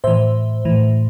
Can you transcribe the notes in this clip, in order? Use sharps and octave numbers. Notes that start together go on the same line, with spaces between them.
A2 E3 C5 E5
A2 E3